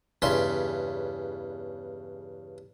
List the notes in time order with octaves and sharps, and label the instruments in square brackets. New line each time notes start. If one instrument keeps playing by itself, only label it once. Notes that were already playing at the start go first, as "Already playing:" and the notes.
[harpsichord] E2 G2 C#3 C6